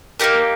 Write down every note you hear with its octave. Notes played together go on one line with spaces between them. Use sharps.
A#3 D#4 G4 A#4